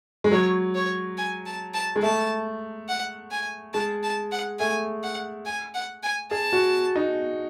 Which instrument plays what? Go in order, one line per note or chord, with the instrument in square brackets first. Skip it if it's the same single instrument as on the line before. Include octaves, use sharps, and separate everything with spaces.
[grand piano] G#3
[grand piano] F#3 [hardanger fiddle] C#5
[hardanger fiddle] C#5
G#5
A5
A5
[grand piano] G#3
[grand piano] A3 [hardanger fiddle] A5
[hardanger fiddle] F#5
G#5
[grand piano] G#3 [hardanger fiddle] A5
[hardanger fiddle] A5
F#5
[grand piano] A3 [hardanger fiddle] G#5
[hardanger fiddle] F#5
G#5
F#5
G#5
[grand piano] G#4 [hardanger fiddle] A5
[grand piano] F#4
D#4